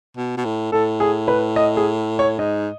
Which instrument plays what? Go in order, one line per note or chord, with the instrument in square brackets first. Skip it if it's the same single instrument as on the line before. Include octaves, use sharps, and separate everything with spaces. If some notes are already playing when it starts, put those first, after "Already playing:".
[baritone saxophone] B2
B2
A2
[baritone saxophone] A2 [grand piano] A4
[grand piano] G#4
B4
D#5
G#4
C#5
[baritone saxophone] G#2 [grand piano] D#5